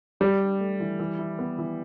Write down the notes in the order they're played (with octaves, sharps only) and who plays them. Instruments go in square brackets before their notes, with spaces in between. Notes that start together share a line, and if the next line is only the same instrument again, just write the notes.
[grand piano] G3 [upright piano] G4
[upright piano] D4
A3
E3
E3
E4
B3
E3